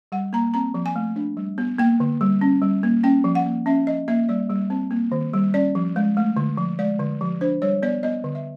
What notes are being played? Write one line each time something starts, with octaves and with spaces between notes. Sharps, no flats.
G3 F#5
A#3 A#5
C4 A#5
F3
G#5
A3
D4
G3
B3
A#3 G5
D3
G3
C#4
G3
A#3
C#4 G5
F3
F#5
A#3
C#4 E5
F3 D#5
A#3 E5
G3 D5
G3
C4
A#3
D#3
G3
C#4 D5
F3
G#3
A3
D3
F3
G#3 D5
D3
F3
D4 C5
G3 C#5
B3 D5
B3 D#5
D3
E5